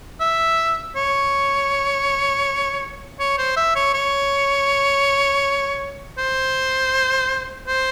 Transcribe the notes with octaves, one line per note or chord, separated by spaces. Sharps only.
E5
C#5
C#5
C5
E5
C#5
C#5
C5
C5